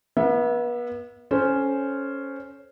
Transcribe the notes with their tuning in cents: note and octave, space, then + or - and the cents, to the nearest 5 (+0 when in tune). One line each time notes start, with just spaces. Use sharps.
B3 -35 E5 +0
C#4 +0 A4 -25 C5 +0